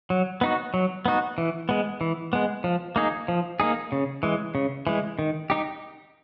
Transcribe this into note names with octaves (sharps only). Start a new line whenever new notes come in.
F#3
B3 D#4 F#4
F#3
B3 D#4 F#4
E3
G#3 B3
E3
G#3 B3
F3
A#3 D#4 G#4
F3
A#3 D#4 G#4
C#3
E3 G#3
C#3
E3 G#3
D#3
D#4 G4